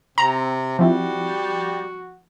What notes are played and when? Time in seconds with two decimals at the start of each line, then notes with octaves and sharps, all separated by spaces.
0.18 C3 C4 A#5
0.79 F3 G3 C4 E4 F#4